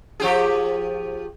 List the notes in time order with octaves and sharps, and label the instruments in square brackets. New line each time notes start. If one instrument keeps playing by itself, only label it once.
[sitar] F3 G4 G#4